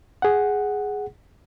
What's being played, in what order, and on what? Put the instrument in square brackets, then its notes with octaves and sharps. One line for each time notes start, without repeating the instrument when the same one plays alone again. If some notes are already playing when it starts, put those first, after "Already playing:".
[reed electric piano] G#4 F#5